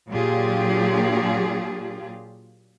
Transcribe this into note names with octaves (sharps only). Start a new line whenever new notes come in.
A#2 F#3 D4 F4 G4 G#4